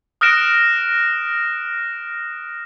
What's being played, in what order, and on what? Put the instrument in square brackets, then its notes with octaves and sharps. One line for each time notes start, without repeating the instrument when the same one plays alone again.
[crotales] D#6 F6 F#6 A#6 D7 E7